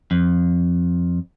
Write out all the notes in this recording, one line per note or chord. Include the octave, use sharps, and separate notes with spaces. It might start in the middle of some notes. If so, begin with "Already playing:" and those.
F2